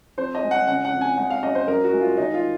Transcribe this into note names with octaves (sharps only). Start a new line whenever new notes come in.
F2 C5
D#5
G#3
F#5
C#3 F#5
F#5
F2
G#5
G#3 F#5
F5
F#2 D#5
C5
F#2 A#4
F#4
G#3
F4
D#3 D#4
F4